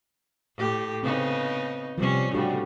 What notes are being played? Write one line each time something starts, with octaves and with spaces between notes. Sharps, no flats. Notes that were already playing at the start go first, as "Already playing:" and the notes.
A2 G4
C#3 B3 C4 D#4
C3 F3 G3 C#4
A2 C#3 G3 D4 F#4 G4